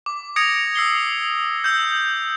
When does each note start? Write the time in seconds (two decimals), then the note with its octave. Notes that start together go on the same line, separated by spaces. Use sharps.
0.06 D6
0.36 D#6 G#6 A#6 C#7 D7 F7
0.75 E6 C7 G7
1.64 E6 G6